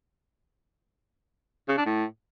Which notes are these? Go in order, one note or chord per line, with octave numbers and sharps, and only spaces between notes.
C#3
D4
A2